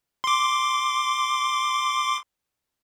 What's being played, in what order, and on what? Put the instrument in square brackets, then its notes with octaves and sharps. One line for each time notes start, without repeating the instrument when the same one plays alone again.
[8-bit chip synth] C6 D6